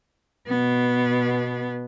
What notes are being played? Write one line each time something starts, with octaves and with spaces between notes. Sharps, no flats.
B2 B3